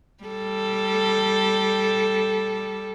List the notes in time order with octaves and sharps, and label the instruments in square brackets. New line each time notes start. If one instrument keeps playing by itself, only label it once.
[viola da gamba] G3 A4